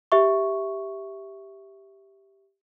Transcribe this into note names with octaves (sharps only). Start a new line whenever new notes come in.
G4 E5 C#6